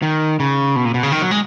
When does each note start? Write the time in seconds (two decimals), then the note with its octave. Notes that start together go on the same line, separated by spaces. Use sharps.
0.02 D#3
0.40 C#3
0.76 B2
0.85 A#2
0.94 B2
1.03 C#3
1.12 D#3
1.21 F#3
1.31 G#3